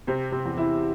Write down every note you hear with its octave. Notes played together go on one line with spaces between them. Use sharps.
C3 C4
C3 C4
E2
E3 E4